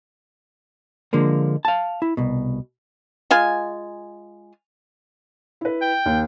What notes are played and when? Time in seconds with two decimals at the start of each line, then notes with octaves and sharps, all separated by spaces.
1.13 D3 F3 G#3 A#3
1.65 F5 A5
2.02 E4
2.17 C2 B2
3.31 G#3 F4 G#5
5.61 E4 B4
5.82 G5
6.06 D#2